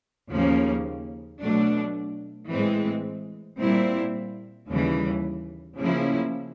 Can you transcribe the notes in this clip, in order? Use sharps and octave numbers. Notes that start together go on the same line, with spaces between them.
D#2 C#3 F3 A#3 C#4
B2 F#3 A3 D4
A2 E3 G#3 C4
A#2 G3 C4 E4
D#2 C#3 E3 G3
C#3 F3 A#3 C#4 E4